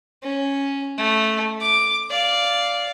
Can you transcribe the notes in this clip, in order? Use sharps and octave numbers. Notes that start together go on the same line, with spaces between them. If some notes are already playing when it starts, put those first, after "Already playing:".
C#4
A3
D6
D5 F5